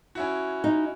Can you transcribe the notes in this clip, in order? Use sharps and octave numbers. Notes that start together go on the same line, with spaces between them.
C#4 E4 F#4
D#4